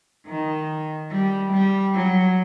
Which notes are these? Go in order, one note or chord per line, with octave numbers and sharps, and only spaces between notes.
D#3
G3
G3
F#3